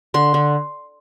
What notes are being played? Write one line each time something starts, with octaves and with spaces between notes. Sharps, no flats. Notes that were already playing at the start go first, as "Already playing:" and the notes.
D3 C6
D3